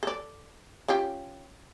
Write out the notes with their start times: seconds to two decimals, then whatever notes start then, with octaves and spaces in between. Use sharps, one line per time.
0.03 A4 D5
0.88 C#4 F4 G4